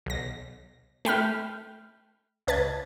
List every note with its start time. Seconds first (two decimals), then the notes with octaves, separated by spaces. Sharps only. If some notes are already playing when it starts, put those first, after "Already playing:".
0.06 B1 A#6
1.05 A3 G5 B5 F6
2.47 C#2 B4 A5 G#6